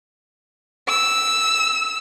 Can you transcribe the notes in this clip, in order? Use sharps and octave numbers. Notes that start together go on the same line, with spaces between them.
E6